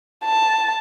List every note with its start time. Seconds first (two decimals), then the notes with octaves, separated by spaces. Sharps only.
0.25 A5